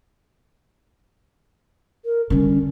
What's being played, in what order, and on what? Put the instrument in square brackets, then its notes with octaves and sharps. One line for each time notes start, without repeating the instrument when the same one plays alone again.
[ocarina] A#4
[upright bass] D3 G3 [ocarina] C#4